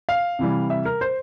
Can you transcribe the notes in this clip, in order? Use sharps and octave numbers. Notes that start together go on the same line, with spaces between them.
F5
C3 E3 G3
E5
A#4
C5